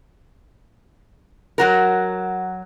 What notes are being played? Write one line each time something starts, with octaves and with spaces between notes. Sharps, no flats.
F#3 F#4 A#4